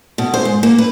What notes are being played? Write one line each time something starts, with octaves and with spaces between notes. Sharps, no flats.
B2
C5
G#2
A#3
B4